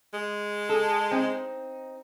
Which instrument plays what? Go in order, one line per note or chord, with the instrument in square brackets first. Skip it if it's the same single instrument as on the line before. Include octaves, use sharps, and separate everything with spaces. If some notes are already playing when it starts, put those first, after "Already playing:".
[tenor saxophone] G#3
[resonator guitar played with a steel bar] A4
C4 D#4